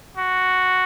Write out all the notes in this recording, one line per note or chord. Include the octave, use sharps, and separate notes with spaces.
F#4